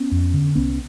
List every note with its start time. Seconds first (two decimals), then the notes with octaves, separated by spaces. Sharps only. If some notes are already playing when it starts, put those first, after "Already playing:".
Already playing: B3 C#4
0.12 F2
0.34 D3
0.55 C2 B3 C#4